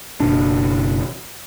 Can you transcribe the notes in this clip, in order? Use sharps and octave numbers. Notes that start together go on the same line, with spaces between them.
F#1 B2 D4